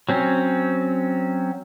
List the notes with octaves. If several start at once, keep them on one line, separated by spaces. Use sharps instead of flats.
F#3 C4 C#4